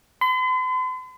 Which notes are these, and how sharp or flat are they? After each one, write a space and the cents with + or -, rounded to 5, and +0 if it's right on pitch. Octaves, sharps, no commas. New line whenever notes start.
C6 -45